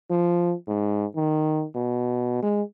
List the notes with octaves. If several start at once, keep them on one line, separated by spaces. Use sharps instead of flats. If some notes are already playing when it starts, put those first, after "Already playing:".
F3
G#2
D#3
B2
G#3